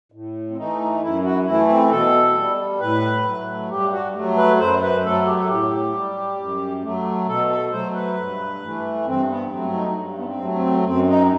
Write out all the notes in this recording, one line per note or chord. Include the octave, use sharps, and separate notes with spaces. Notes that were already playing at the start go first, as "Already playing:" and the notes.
A2
C4
E3 A3 D#4
D#4
F#2 E4
F#4
E3 A3 E4
C4
B2 A4
G3
A2 B4
F#3 A3
G2 G4
F#4
F#3 A3
B4
F#2 C5
B4
F#3 A3 A4
G4
A4
A2 G4
G3
F#2
F#3 A3
B2 A4
A4
F#3 A3 C5
B4
G2
E3 A3
G2 C4
B3
F#3 A3 C4
D#4
G2
B3
C4
F#3 A3
C4
F#2 C4
D#4